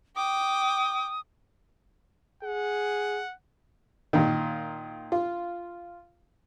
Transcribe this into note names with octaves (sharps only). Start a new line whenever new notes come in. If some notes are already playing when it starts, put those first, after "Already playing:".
G5 D6 D#6
G#4 F#5
A#2 D#3
F4